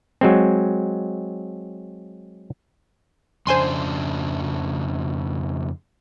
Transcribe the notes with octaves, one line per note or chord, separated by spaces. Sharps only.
F#3 G#3 C4
F2 C#3 D4 C5 G#5 C6